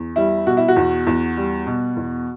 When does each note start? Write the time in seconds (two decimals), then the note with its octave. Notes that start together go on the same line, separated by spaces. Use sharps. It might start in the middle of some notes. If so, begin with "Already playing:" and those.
Already playing: E2
0.16 G3 E4
0.46 B2 F#4
0.57 E4
0.68 F#4
0.76 E2
1.07 E2
1.37 G3
1.67 B2
1.97 E2